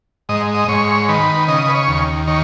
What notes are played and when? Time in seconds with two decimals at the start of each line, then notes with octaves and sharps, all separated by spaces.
0.29 G#2 D#5
0.54 D#5
0.68 G#2 C#5
1.08 D#3 B4
1.48 C#3 D#5
1.68 B4
1.75 C#5
1.88 D#2
2.27 D#3 C#5